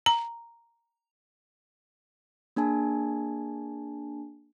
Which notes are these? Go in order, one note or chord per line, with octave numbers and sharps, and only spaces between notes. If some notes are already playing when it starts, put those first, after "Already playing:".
A#5
A#3 D4 G#4 G#5 A5